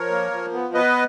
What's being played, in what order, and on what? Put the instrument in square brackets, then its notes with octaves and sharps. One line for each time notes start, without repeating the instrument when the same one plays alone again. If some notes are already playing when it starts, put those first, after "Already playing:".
Already playing: [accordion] F3 A#4 C#5
A#3
F3
B3
B3 B4 D#5